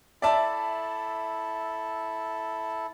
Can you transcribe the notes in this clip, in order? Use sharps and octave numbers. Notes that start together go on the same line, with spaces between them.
E4 A4 D5 E5 A5